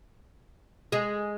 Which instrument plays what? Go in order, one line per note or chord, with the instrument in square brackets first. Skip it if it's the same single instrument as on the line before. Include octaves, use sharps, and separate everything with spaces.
[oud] G#3 G#4